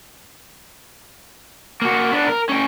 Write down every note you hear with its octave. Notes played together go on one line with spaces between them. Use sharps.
A#3 F#4
B3 D4
A#4
C#4 G5